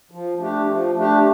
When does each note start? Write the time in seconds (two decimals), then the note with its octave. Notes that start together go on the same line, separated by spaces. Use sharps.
0.11 F3
0.40 A3 D4 G4
0.68 F3
0.96 A3 D4 G4